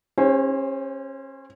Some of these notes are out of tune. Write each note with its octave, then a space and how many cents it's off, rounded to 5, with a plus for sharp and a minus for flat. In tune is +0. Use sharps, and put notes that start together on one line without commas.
C#4 -30 G4 +45 C5 +0